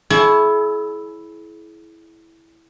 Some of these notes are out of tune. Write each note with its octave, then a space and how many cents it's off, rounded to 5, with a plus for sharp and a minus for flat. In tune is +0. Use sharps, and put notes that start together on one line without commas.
E4 +0 G#4 +40 C#5 +30